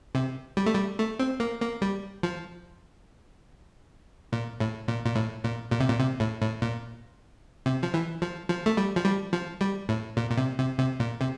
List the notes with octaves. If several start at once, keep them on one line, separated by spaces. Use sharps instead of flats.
C3
G3
A3
G3
A3
C4
A#3
A#3
G3
F3
A#2
A2
A#2
A#2
A2
A#2
A#2
C3
A#2
C3
A2
A2
A#2
C3
F3
E3
F3
F3
A3
G3
F3
G3
F3
G3
A2
A#2
A#2
C3
C3
C3
A#2
C3